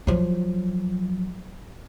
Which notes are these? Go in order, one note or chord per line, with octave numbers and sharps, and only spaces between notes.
F3 F#3